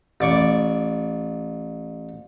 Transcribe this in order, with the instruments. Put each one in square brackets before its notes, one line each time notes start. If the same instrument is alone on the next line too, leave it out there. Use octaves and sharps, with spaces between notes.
[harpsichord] A1 D5 C#6 D6